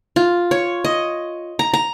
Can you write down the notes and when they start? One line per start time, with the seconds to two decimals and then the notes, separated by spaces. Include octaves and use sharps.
0.16 F4
0.51 C#5
0.85 D#5
1.59 A#5
1.74 A#5